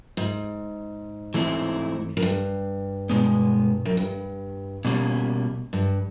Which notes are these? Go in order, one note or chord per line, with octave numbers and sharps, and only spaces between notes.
G#2
E3 A3 C4 E4
F#2
G2
B2 G#3 B3
F#2
G2
B2 G3 A#3 C#4
G2